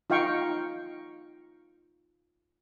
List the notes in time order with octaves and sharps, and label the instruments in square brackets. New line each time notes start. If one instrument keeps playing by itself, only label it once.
[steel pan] D#4 F4 F5 G5 C#6